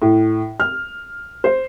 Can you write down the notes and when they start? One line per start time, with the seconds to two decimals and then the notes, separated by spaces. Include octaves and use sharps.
0.02 A2
0.60 F6
1.44 C5